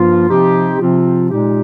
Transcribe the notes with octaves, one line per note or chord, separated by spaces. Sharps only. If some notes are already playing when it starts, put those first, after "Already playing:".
Already playing: G2 F3 A#3 F4
C3 F3 C4 D#4 G4
C3 F3 C4 F4
A#2 G#3 D#4 G4